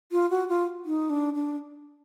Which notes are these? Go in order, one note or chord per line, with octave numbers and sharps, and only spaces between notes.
F4
F#4
F4
D#4
D4
D4